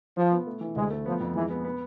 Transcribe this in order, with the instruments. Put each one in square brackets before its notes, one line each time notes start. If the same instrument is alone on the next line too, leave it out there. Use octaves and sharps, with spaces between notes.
[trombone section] F3 [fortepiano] F4
[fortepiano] B3
A3
E3
[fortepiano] D2 [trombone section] G#3
[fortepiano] A3
[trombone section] F3 [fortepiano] B3
[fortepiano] F2
[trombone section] E3 [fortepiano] G#3
[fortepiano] B3
B3